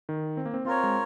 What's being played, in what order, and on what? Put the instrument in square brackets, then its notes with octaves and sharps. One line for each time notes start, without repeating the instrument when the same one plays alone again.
[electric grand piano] D#3
C4
A#3
C4
[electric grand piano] C4 [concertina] F4 A#4 C#5
[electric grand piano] G#3